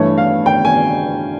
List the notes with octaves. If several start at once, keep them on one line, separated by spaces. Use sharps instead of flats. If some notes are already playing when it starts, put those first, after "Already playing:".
Already playing: G2 E3 A3 C#5
F5
G5
G#5